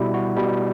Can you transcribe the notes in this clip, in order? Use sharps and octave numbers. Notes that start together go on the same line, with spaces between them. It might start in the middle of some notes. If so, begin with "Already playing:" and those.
Already playing: B2 G3 E4
F#4
B2 G3